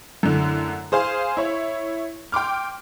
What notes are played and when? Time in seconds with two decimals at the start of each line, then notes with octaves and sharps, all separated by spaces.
0.23 F#2 A2 D3
0.92 G#4 C5 F5 G#5
1.37 E4 C#5
2.32 G5 C6 D6 F6